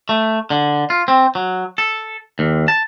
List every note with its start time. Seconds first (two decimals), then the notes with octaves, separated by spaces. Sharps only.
0.09 A3
0.50 D3
0.90 F4
1.08 C4
1.35 F#3
1.78 A4
2.39 D#2
2.68 A5